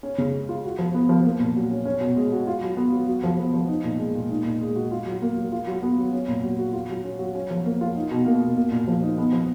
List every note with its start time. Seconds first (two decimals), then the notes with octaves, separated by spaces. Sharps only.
0.03 C#4
0.18 C#3
0.33 G#3
0.49 F4
0.64 F#4
0.79 F3
0.94 B3
1.09 F3
1.25 A#3
1.40 A#2
1.56 F#3
1.71 C#4
1.85 C#4
2.01 B2
2.16 G#3
2.32 F#4
2.47 F4
2.62 F#3
2.77 B3
2.92 F#3
3.08 F#4
3.24 F3
3.38 B3
3.54 F3
3.68 D#4
3.84 A#2
3.99 G#3
4.15 A#2
4.30 D#4
4.45 A#2
4.61 G#3
4.76 F#4
4.91 F4
5.06 F#3
5.22 A#3
5.37 F#3
5.52 F4
5.67 F#3
5.83 B3
5.98 F#3
6.13 C#4
6.28 A#2
6.44 F#3
6.59 F#4
6.73 F4
6.89 F#3
7.04 C#4
7.19 F#3
7.35 C#4
7.51 F3
7.65 A#3
7.81 F4
7.96 D#4
8.11 B2
8.26 A#3
8.41 B2
8.57 A#3
8.72 A#2
8.88 F3
9.03 D#4
9.18 B3
9.33 F3